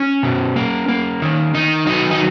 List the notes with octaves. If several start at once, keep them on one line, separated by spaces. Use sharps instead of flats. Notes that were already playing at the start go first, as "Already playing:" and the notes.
Already playing: C#4
B2
A#3
A#3
D#3
D#3 D#4
F#3 D#4
D#4